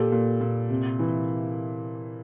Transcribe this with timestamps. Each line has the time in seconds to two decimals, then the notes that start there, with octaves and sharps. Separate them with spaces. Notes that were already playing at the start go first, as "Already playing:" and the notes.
Already playing: A#2 G4 A4
0.12 A#2
0.41 A#2
0.70 C3
0.99 E3